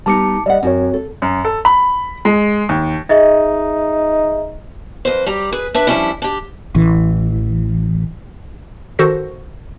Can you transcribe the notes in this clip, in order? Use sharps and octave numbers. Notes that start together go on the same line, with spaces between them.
G3 B3 D#4 A5 D6 C#7
G3 D5 D#5 F#5
F#2 C4 F#4 C#5
A4
F#2
A4
B5
G#3
D#2
D#4 G#4 D#5 E5
F2 B4 C5
G3 G4 A#5
G#4 B4
D4 B4 E5
F3 G3 A#3 C#4 D4 E4
D4 G4
A1 E3
D#3 F#4 A4 C5 A#6